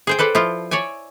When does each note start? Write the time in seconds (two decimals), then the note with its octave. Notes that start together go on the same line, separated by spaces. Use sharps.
0.07 G#4 C5 G5
0.19 A4 B4 C5 D5
0.35 F3 E4 F4
0.71 C#5 D5 E5 G#5